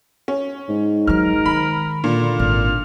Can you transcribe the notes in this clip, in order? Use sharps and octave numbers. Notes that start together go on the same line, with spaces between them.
C#4
G#2
E3 F#3 A#4 F6
D#3 B5
A#2 D3
G#1 F6